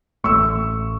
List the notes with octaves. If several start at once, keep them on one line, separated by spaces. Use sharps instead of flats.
A1 A3 C#6 E6